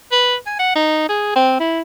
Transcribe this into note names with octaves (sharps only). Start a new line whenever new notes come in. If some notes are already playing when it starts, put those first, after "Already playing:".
B4
G#5
F#5
D#4
G#4
C4
E4